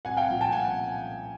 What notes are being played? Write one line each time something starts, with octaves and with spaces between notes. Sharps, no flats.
C2 F#5 G#5
F5 G5
A#2 F3
G5 A5
F#5 G#5